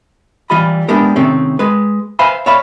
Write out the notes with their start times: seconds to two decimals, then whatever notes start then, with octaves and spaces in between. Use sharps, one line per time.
0.50 E3 G3 F4 D#5 B5
0.88 G#3 B3 D4 E4 G4 A#4
1.16 C3 D#3 A3 C4 C#4
1.59 G#3 B4
2.19 B4 C5 E5 F5 G#5 B5
2.46 C#5 D5 E5 F5 B5